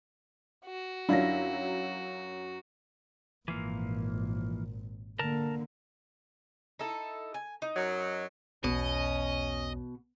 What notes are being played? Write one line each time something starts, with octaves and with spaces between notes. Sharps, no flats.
F#4
F#2 F#3 D4 E4 F4 A#6
G#1 A#2 E3 F3 A#3
D3 A#3 A#4 A5
D#4 E4 A4
G#5
D#4
F#2 F#3
B1 E2 B2 C#4 D#5